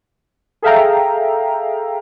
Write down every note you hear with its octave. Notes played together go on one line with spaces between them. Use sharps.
G#4 A4 E5 F5 G5 A#5